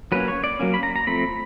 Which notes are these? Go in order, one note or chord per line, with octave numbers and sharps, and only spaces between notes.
F#3 A#3 C#4 B4
C#5
D5
F#3 A#3 C#4
B5
A#5
A#5
F3 A3 C4 B5